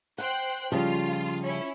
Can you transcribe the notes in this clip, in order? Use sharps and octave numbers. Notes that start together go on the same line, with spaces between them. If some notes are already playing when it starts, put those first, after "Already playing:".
C5 F#5 G5 F#6
C#3 F3 G3 F4
C#4 E4